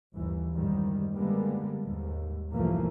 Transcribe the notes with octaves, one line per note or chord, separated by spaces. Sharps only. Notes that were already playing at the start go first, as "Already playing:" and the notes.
G1 D#2 E3
F#1 G#2 D#3 G3
D3 G3 G#3 A#3 B3
D#2 G#2
B1 G2 E3 F3 A3 A#3